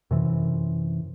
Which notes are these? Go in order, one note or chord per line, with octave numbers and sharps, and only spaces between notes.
F#2 C3 E3